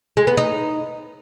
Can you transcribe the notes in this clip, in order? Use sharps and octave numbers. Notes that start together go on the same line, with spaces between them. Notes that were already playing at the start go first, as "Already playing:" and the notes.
G#3
B3
D#4